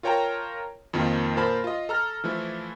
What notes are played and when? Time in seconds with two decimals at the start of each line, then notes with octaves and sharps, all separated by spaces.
0.03 F4 A#4 C#5 G5 A5 A#5
0.93 F2 D#3 F3 A#3 D#4 F4
1.36 A#2 A#4 C5 A5 B5
1.64 F4 D#5
1.89 A4 A#5 F6
2.24 E3 F3 A3 E4